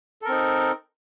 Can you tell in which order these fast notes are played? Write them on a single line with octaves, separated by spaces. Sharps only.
A4 A#4 C4 D#4